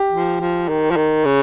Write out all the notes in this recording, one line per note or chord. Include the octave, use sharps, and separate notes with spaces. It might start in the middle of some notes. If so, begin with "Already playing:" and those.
Already playing: G4
F3
F3
D#3
F3
D#3
C#3